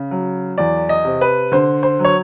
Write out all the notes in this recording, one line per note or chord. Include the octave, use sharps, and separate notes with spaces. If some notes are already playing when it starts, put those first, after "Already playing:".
Already playing: C#3
F#3
E2 D5
D#5
C3
B4
D3 C5
C5
F#3
C#5